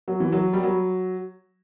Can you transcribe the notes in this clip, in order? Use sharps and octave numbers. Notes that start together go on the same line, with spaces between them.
F#3
E3
F#3
G3
F#3